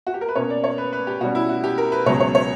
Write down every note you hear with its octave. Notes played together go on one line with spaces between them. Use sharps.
F#4
G4
A#4
B4
B2 A#3 C#4 C#5
D5
C#5
B4
B4
G4
B2 G3 C#4 F#4
E4
F#4
G4
A#4
B4
C#2 B2 F#3 C#5
C#5
C#5